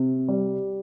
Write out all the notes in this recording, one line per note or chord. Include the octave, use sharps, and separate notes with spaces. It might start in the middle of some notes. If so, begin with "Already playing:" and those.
Already playing: C3
G3